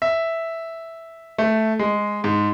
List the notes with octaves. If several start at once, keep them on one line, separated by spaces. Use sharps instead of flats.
E5
A3
G#3
G#2